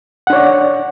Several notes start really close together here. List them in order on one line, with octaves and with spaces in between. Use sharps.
F#5 D4 C#5 D5